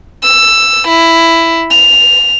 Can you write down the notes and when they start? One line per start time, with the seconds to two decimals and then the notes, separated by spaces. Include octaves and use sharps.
0.23 E6
0.88 E4
1.71 F7